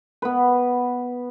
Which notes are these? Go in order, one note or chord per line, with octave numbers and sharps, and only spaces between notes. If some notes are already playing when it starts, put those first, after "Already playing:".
B3 B4